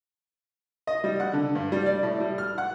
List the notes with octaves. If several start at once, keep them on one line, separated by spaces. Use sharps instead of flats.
D#5
G3
F#5
D3
G2
G3
D5
A2
G3
F6
F#5